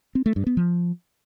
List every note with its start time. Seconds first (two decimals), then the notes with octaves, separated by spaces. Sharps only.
0.15 C4
0.26 A3
0.36 G2
0.47 B3
0.57 F3